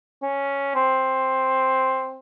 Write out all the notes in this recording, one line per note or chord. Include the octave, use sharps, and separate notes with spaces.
C#4
C4